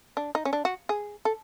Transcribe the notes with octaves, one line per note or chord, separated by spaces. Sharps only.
D4
D#4
C#4
D4
F#4
G#4
A4